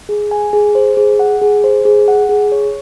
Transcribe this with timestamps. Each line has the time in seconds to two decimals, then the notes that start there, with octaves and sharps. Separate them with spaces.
0.09 G#4
0.31 G#5
0.53 G#4
0.75 C5
0.97 G#4
1.19 F#5
1.42 G#4
1.64 C5
1.85 G#4
2.08 F#5
2.29 G#4
2.52 C#5